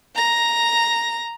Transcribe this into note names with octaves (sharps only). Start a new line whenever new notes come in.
A#5 A#6